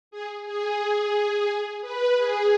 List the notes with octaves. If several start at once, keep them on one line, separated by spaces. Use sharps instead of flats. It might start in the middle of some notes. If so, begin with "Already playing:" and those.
G#4
G#4
G#4
B4
G#4